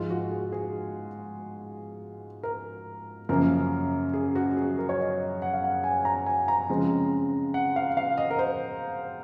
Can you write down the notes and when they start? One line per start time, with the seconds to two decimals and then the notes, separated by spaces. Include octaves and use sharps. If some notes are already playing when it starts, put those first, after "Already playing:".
Already playing: G#2 F3 G#3 F4
0.10 F#4
0.31 G#4
0.52 G#4
2.43 A#4
3.29 F#2 C#3 F3 A#3 A#4
4.14 G#4
4.35 F#4
4.57 G#4
4.78 A#4
4.89 C#5
5.00 D#5
5.42 F#5
5.53 F5
5.64 F#5
5.84 G#5
6.05 A#5
6.26 G#5
6.48 A#5
6.69 C#3 F3 G#3 C4
7.54 F#5
7.76 F5
7.97 F5
8.18 D#5
8.31 A#4
8.39 C5